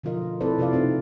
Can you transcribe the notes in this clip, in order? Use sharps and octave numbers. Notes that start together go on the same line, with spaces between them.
B2 D3 F3 F4 A#4 D#5
C4 E4 A4 B4 C5 D5
C3 E4 F4 D5 F5
C4 D#4 F4 A4